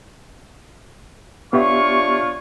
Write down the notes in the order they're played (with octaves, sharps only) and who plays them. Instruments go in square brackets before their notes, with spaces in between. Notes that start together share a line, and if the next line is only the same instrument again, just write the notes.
[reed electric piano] B3 G4 E5 [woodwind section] D4 F4 C#5 [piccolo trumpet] C#6